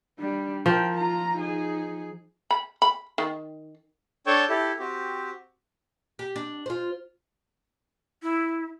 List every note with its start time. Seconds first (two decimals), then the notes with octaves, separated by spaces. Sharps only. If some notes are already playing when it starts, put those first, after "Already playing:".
0.19 G3 D4
0.66 F3 A#4 G5
0.95 F4 A#5
1.38 D#4 G#4
2.51 B5
2.82 B5
3.18 D#3
4.27 D4 A4 C#5 G5 A5 C#6
4.49 E4 G4 A4
4.79 C4 F#4 G4
6.19 G4
6.36 D4
6.66 F4 C5
8.23 E4